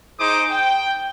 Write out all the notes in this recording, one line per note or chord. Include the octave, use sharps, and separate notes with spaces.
D#4 G#4 C5 D6 D#6
G5